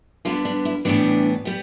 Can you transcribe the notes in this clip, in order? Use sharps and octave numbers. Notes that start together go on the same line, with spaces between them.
D3 G3 B3 F4
D4
E4
A2 E3 G3 B3 D4
G3 B3